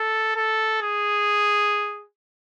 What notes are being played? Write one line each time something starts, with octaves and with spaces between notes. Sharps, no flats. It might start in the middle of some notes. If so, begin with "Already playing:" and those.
Already playing: A4
A4
G#4